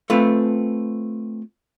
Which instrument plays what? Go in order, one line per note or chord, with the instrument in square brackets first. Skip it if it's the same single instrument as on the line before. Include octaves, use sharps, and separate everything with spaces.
[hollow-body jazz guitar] A3 C4 F4 B4